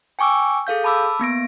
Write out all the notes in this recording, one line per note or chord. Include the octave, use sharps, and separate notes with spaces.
G5 G#5 C#6 D6 E6
G#4 A4 F5 G6
A5 B5 D6 E6
A#3 B3 A#6 D7